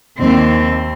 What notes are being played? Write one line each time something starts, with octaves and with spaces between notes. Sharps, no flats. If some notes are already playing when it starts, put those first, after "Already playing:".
D#2 C4